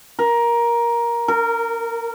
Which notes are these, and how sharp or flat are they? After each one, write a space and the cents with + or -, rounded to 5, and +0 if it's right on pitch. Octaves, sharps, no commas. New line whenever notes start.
A#4 +15
A#4 -20